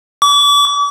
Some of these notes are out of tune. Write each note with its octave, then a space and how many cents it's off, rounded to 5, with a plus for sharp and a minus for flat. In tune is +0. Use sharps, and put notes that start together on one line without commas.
D6 -40